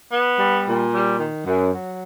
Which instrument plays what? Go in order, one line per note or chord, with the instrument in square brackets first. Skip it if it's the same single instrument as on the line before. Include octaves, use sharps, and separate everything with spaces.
[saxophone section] B3
G3
A#2
G3
D#3
F#2
F#3